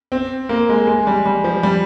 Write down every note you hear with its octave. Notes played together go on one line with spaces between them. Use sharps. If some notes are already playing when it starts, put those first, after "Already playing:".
C4
A#3
G#3
G#3
G3
G3
F3
G3